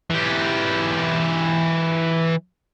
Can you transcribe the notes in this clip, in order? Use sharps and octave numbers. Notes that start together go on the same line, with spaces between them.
E3 G4